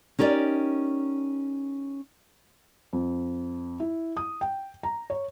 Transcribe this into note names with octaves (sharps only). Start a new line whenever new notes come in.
C#4 D#4 G4 A#4 D5
F2
E4
D#6
G5
A#5
C#5